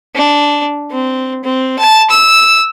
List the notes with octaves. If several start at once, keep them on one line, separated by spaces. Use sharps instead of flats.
D4
C4
C4
A5
E6